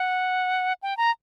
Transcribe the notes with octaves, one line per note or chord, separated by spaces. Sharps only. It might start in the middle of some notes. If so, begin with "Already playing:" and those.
Already playing: F#5
G5
A#5